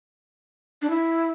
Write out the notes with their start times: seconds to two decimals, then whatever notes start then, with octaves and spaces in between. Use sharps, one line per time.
0.82 D4
0.90 E4